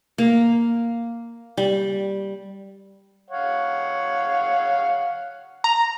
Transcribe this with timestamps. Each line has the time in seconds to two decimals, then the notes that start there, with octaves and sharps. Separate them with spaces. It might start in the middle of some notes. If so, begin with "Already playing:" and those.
0.18 A#3
1.57 G3
3.30 C#5 F5 F#5
5.64 A#5